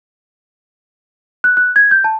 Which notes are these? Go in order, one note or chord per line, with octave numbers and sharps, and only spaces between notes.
F#6
F#6
G#6
G6
A5